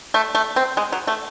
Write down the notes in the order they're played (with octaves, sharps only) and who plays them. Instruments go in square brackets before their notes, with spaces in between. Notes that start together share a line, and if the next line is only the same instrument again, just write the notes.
[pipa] A3
A3
C4
G#3
F#3
A3